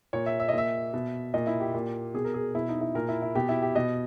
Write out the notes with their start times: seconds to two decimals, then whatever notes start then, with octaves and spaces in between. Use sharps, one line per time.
0.13 A#2 C#5
0.26 E5
0.40 E5
0.49 D#5
0.53 A#2 E5
0.94 B2
1.34 A#2 D#5
1.47 E4
1.60 G4
1.74 A#2
2.14 B2 G#4
2.25 A#4
2.34 G#4
2.55 B2 E4
2.69 D#4
2.81 E4
2.95 A#2 A#4
3.09 E4
3.22 E4
3.35 B2 G4
3.49 E4
3.62 G4
3.75 B2 D#5